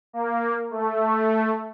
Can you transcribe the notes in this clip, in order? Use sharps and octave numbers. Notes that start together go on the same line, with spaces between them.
A#3
A3